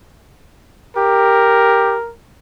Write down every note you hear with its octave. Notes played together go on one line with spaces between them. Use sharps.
G4 A#4